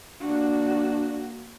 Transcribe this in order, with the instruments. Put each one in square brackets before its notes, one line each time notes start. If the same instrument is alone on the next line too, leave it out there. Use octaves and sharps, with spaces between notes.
[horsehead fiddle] A#3 F#4 [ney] D4